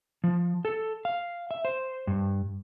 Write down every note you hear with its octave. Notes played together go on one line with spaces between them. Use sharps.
F3
A4
F5
E5
C5
G2